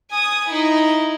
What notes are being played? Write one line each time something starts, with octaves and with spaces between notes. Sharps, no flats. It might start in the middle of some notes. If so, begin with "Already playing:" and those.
G#5 D#6
D#4 E4